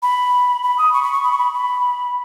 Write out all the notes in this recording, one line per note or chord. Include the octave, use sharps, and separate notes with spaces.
B5
B5
D#6
C#6
B5
C#6
B5
C#6
B5
B5